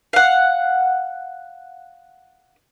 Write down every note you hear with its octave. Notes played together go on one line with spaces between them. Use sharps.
F5 F#5